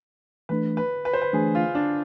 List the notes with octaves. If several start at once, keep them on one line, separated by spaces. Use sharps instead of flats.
E3 A3 D4 B4
B4
B4
C5
B4
E3 A3 D4 G#4
F4
D4